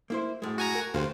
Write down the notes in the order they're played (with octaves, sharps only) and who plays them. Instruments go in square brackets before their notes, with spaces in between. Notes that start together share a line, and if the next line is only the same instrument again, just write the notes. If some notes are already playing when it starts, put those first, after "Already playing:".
[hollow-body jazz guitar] A#3 E4 C5
F#2 A2 G#3
[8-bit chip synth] F#4 G#5 A#5
[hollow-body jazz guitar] A#4
[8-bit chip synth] D2 [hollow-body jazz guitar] G4 C5 F5